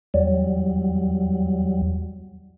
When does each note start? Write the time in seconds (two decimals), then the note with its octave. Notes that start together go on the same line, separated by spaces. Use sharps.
0.14 E2 F#3 G3